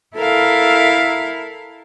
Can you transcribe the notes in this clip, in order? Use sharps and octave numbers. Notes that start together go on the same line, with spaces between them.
E4 A4 A#4 F5